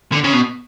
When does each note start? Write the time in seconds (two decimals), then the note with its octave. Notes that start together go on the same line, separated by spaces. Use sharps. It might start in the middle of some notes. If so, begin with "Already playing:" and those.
0.12 D3
0.24 C#3
0.33 B2